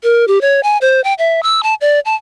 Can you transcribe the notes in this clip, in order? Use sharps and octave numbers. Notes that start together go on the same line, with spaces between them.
A#4
G4
C#5
G#5
C5
G5
E5
E6
A5
D5
A5